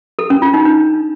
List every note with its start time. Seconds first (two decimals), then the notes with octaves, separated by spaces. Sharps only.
0.19 A4
0.30 C#4
0.42 F4
0.54 D#4
0.65 D4